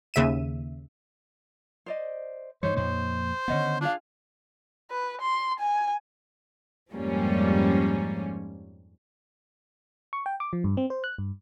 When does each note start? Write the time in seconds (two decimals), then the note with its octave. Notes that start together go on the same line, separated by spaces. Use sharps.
0.14 D#2 C#3 E5 D#7 E7
1.86 C5 D5 D#5
2.63 G2 E3 G3 D#4 C5 C#5
2.76 F2 A#2 A#3 C5
3.48 D3 D#3 B3 C#4 D#5 F#5
3.81 D4 F4 G#4 F5
4.91 B4
5.21 C6
5.59 G#5
6.91 F2 G#2 F3 G3 A#3 C#4
10.13 C#6
10.26 G5
10.40 D6
10.53 F3
10.64 G2
10.77 C4
10.90 C5
11.04 F#6
11.18 G2